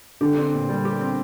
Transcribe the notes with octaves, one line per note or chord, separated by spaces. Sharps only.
D3 G4
C4
A#2
G3
G4
C4